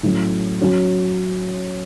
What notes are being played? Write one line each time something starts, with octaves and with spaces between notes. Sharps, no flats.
A2 F#3 C#4
F#3 C#4 F#4